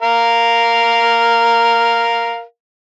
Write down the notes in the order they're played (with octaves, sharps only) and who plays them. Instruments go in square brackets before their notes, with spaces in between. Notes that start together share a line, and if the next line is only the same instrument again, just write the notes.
[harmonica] A#4 F5